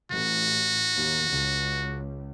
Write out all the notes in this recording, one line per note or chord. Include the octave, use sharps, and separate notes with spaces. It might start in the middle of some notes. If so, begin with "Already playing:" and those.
A1 F#4
D#2
C#2